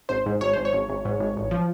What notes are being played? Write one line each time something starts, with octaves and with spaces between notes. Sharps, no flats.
G#1 C5
G#2
G#1 C#5
G#1 C5
C#5
G#1
G#1
G#2
G#1
A1
F3